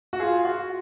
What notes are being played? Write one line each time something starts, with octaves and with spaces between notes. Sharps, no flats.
F#4
F4 G#4
F#4